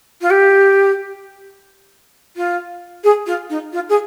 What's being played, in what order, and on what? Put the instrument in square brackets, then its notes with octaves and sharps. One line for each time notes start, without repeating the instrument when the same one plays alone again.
[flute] F4
G4
F4
G#4
F4
D#4
F4
G#4